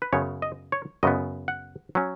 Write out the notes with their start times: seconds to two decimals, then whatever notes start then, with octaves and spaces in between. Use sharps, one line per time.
0.02 B4
0.13 F#2 C#3 B3 C#5
0.42 D#5
0.72 C#5
1.03 F#2 C#3 B3 D#5
1.48 F#5
1.95 F#3 C#4